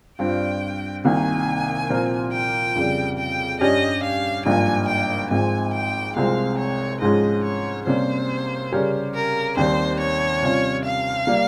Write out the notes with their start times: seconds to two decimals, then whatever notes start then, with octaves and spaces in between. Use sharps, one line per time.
0.19 G2 G3 C4 F4 G5
1.04 C2 C3 D#3 A#3 G#5
1.90 A#2 F3 C4 F4 A#4
2.32 G5
2.75 F2 C#3 G3
3.18 G5
3.61 G2 G3 C#4 G4 D#5
4.03 F5
4.45 G#1 G2 F3 A#3 G#5
4.88 G5
5.30 G#1 G#2 F3 C4 G#5
5.74 G5
6.16 C2 C3 F3 G#3 C4 F5
6.59 C#5
7.01 G#2 F3 G#3 C#4 D#5
7.44 C#5
7.86 C3 G3 A#3 C#4 C5
8.72 C#3 G3 C#4 G4 A#4
9.15 A#4
9.57 D#2 D#3 G3 C4 G4 C5
10.00 C#5
10.42 C3 G3 C#4 F4
10.85 F5
11.27 G3 A#3